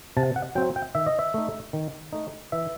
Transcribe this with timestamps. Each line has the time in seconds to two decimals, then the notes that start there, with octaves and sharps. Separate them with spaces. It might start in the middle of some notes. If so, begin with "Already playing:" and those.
0.17 C3 A5
0.36 F#5
0.55 F#3 C4 G5
0.76 G5
0.95 D#3 E5
1.06 D#5
1.19 E5
1.34 A3 D#4
1.73 D#3
2.13 A3 D#4
2.52 E3 E5